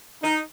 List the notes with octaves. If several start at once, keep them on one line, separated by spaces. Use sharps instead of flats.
D#4